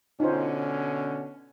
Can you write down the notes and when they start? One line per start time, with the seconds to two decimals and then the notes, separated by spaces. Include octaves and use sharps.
0.20 B2 D3 C#4 D#4 F4 C5